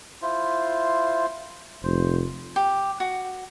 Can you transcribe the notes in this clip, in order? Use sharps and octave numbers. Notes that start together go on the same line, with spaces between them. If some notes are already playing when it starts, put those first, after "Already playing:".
E4 F4 C5
F1 C5
G4
F#4